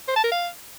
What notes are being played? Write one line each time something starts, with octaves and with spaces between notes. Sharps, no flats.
C5
A5
A#4
F5